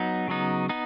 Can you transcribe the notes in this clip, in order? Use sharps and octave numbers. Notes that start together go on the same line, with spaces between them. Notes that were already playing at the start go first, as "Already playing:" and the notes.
Already playing: F#3 B3 D#4
C#3 F#3 B3 D#4
B3 D#4